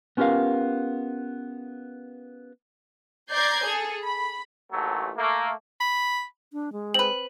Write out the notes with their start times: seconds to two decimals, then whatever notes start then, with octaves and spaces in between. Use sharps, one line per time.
0.17 B3 C#4 F4 G4 A#4 F5
3.30 D5 A#5 G6 G#6 C7
3.64 G#4 A4
4.01 B5
4.72 A1 D#2 F#3 A3
5.17 A3 A#3
5.80 B5
6.53 D4
6.73 G#3
6.94 C4 B4 F#7